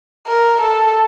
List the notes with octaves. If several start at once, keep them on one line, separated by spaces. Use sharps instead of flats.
A#4
A4